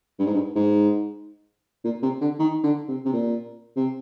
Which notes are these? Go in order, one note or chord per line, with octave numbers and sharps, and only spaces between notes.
G2
G#2
G2
G#2
A#2
C3
D3
D#3
D3
C3
C3
A#2
C3